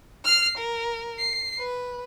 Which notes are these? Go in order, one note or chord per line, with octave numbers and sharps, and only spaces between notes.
F6 C7
A#4
C7
B4